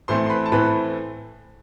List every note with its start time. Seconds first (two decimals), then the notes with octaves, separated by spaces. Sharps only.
0.08 A2 E3 A3 C4 C5 C6
0.26 C6
0.30 B4 B5
0.46 A5
0.52 A2 E3 A3 C4 B4 B5